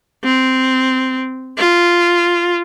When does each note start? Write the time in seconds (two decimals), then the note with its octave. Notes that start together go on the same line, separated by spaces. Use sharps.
0.24 C4
1.58 F4